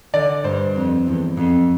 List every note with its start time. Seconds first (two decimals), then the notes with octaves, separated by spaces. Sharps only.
0.14 D3 D5
0.44 G2 C5
0.76 F2
1.07 E2
1.37 F2